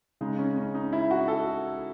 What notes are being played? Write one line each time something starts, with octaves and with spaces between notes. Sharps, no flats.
C#3 G#3 D#4
C#4
C#4
D#4
E4
F#4
A4